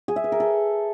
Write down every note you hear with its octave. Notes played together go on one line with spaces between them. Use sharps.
G#4
E5
B4
A#4
A4